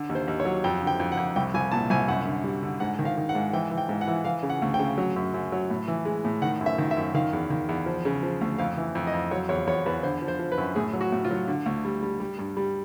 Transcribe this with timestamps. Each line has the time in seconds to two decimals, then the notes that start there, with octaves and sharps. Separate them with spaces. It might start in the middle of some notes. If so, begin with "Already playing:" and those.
Already playing: D3
0.09 D#2
0.15 C5
0.28 D#2
0.40 C#5
0.45 F#3
0.64 F2 G5
0.82 D3
0.87 G5
1.00 F2
1.12 F#5
1.17 F2
1.36 C2 G5
1.54 C2 G#5
1.72 A#2 A5
1.90 C2 G#5
2.08 F#2 F#5
2.26 D3
2.44 G3
2.63 D3
2.80 G#2 F#5
2.99 D#3
3.05 F5
3.17 D#3
3.29 F#5
3.35 G#2
3.53 E3 G5
3.71 E3
3.78 G5
3.89 G#2
4.01 F#5
4.07 E3
4.25 E3 F5
4.43 C#3
4.50 F#5
4.62 D2
4.74 G5
4.79 C#3
4.98 F#3
5.16 F#2
5.34 F#2
5.52 F#3
5.70 A2
5.88 E3
6.05 G#3
6.25 A2
6.42 D#3 F#5
6.61 F#2
6.66 E5
6.78 D#3
6.91 E5
6.96 F#2
7.14 D#3 F5
7.33 E2
7.50 D#3
7.69 E2
7.86 F3
8.05 C#3
8.23 F3
8.41 D2
8.58 F2 F5
8.77 E3
8.95 F2
9.07 D#5
9.13 F2
9.31 F#3 C#5
9.49 E2 C#5
9.67 E2 C#5
9.86 E2 B4
10.03 D3 C5
10.22 F3
10.28 C5
10.39 F3
10.52 B4
10.58 F#2
10.76 A2 G#4
10.93 F#3
11.01 F#4
11.12 A2
11.24 F4
11.31 F#3
11.48 D3
11.66 D2
11.85 G3
12.03 G3
12.20 G3
12.39 G2
12.57 G3